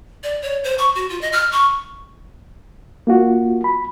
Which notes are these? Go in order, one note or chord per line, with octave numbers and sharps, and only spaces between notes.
D5
C#5
C5
C#6
F#4
F4
D#5
F6
C#6
A#3 F4 F#4
B5